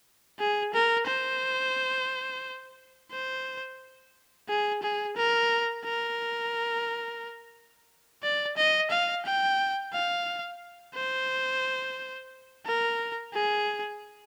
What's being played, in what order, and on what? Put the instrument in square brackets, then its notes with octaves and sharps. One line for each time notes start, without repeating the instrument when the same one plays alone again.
[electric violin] G#4
A#4
C5
C5
G#4
G#4
A#4
A#4
D5
D#5
F5
G5
F5
C5
A#4
G#4